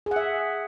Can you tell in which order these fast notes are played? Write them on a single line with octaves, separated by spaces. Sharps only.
G#4 F#5 E5